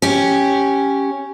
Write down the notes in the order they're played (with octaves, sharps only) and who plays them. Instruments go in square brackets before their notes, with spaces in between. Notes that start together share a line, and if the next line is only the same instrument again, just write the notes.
[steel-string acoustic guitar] C#4 G4